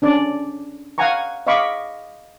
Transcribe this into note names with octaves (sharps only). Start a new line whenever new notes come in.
C#4 D4 D5
F5 F#5 G#5 A#5 C#6
D#5 F5 B5 C#6 D6